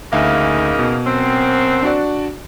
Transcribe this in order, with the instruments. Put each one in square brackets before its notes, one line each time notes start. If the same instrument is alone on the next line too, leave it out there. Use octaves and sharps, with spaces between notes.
[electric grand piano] D2 E5 F5 [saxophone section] C#3 A#3 D#4
[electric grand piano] B2
[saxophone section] F#2 C4
[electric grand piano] D4 F#4 D5